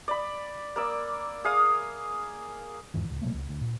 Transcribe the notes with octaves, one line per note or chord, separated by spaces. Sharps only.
D5 B5
A#3 D5 E6
G#4 F5 D#6
E2 G#2 D#3 E3
D1 C#2
B2 F#3 A3 A#3
C#2
D2
A#2